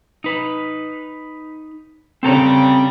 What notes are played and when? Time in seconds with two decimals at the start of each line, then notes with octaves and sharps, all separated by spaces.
0.24 D#4 B4
2.23 C#3 G3 C4 A4 A#5